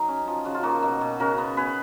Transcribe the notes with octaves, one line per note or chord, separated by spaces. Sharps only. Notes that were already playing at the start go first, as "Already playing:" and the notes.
Already playing: F#3 D#4 G#4
C#4
F3
C#3 F#4
F4
A#3 D#4 F#4
B2
B2
C#3 F#4 A#4
B3
B3 G#4 B4